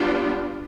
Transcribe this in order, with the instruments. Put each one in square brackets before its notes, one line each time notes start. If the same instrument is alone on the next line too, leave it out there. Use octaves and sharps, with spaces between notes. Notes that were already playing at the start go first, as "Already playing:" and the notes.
Already playing: [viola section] G3 B3 D4 F4